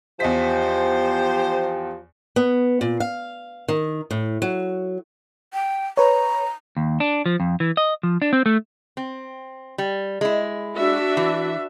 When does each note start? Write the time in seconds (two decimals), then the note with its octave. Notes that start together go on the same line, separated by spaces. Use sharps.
0.20 E2 F3 G4 C5 D#5 B6
2.36 B3
2.81 A#2
3.00 F5
3.68 D#3
4.11 A2
4.42 F#3
5.53 G5
5.97 B4 C#5 A#5
6.77 D#2
7.00 D4
7.26 F3
7.40 F2
7.60 E3
7.77 D#5
8.03 F3
8.22 D4
8.33 C4
8.46 A3
8.97 C4
9.78 G3
10.21 G#3 E4
10.75 D4 F#4 E5
11.17 E3